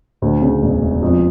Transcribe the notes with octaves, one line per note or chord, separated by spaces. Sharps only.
D2
C#3
E1
E1
F2